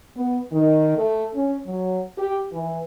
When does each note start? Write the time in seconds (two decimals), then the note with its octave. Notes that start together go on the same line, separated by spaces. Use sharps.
0.16 B3
0.53 D#3
0.97 A3
1.34 C#4
1.67 F#3
2.18 G4
2.52 E3